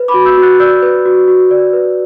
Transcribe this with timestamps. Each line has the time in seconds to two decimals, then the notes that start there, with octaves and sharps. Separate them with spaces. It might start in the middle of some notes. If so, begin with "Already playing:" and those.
Already playing: B4
0.08 B5 D6
0.14 F#4
0.26 E6 G6
0.37 F#4
0.42 F#6 A6
0.60 D5 E6 G6
0.82 B4
1.06 F#4
1.28 F#4
1.51 D5
1.73 B4